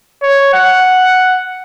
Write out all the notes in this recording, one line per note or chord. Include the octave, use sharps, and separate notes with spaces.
C#5
F#5